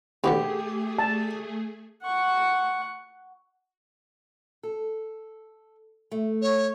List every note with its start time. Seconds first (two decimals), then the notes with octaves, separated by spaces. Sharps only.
0.24 D#2 B2 D3 A3 G4 G#4
0.99 A5
2.03 F#5 C#6
4.63 A4
6.11 A3
6.42 C#5